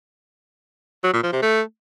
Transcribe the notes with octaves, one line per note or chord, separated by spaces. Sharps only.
F#3
A#2
F3
C3
A3